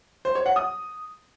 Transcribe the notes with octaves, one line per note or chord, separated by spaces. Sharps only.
C5
C#5
F#5
D#6